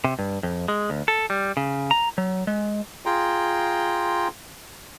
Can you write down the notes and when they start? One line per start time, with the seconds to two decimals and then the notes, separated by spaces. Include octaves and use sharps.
0.04 C3
0.19 G2
0.43 F2
0.68 G#3
0.90 D2
1.08 A4
1.30 G3
1.57 C#3
1.91 A#5
2.18 F#3
2.47 G#3
3.06 F4 G#4 G5 A#5 C6